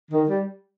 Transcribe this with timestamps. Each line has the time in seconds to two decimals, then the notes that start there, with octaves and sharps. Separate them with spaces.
0.10 D#3
0.29 G3